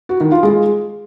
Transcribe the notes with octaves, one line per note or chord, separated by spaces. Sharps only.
F#4
D#3
F4
G#3